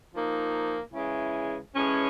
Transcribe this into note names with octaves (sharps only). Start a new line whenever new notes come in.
F3 A#3 D#4
C#3 E3 G#3 C#4 E4
A2 E3 G#3 C#4